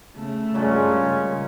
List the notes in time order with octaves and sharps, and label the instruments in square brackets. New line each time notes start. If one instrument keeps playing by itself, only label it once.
[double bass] C#3 [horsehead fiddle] A3
[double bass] G2 G3 [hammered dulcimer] A#2 G#3 [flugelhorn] C#4
[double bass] C#3